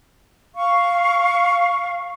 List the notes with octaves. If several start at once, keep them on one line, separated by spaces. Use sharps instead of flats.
F5 C#6